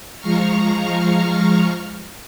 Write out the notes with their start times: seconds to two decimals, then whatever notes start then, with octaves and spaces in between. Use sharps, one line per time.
0.20 F3 G#3 F5 A#5 C#6 F6